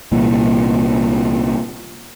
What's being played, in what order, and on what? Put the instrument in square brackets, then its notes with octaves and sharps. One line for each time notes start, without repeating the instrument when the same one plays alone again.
[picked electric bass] C2 A#2 E3